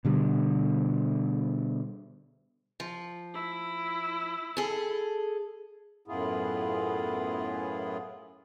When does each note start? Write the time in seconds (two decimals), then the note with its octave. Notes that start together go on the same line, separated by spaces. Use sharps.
0.05 B2 D3 G3
2.80 F3
3.34 E4
4.57 G#4 A4
6.08 F#2 A2 B3 E4 F4 G#4